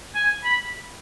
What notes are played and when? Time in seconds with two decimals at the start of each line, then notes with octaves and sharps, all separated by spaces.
0.15 G#5
0.44 B5